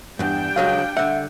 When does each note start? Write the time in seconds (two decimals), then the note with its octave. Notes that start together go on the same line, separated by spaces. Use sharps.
0.19 E2 G2 G3 D4 G5
0.56 C#2 F#3 G#3 F5
0.97 D3 E5 F#5